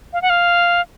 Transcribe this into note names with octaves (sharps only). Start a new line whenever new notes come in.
F5
F#5
F5